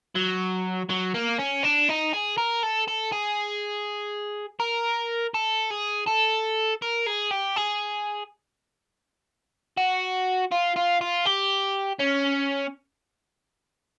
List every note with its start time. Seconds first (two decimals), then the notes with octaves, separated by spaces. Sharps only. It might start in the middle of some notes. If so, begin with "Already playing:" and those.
0.16 F#3
0.90 F#3
1.15 A#3
1.39 C#4
1.64 D4
1.89 D#4
2.13 G#4
2.38 A#4
2.63 A4
2.88 A4
3.12 G#4
4.60 A#4
5.34 A4
5.71 G#4
6.08 A4
6.82 A#4
7.06 G#4
7.31 G4
7.56 G#4
9.78 F#4
10.51 F4
10.76 F4
11.01 F4
11.26 G4
12.00 C#4